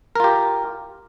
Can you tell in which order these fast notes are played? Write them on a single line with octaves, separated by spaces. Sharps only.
A#4 F4 G4